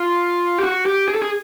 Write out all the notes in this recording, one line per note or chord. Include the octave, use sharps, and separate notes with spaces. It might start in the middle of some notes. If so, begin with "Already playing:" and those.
Already playing: F4
G4
F#4
G4
G#4
A4
G#4